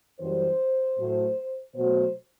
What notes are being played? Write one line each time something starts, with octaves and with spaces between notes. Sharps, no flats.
F#2 E3 G3 C5
A2 F#3 A3
B2 F#3 A3 C5